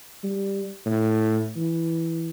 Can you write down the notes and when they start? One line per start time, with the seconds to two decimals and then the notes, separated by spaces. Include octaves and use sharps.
0.24 G3
0.86 A2
1.56 E3